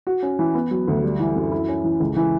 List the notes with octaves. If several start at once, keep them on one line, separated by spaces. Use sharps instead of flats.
F#4
C#4
E3
B3
F#3
D2
G3
E3
F#2
E4
C#4
E3
C#2
E3